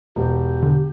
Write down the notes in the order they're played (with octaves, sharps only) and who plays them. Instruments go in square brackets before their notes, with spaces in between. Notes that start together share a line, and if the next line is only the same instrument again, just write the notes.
[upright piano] E1 [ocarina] G4
[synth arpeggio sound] D3